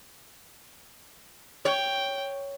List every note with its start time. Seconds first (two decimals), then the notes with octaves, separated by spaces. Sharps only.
1.65 C#5 G5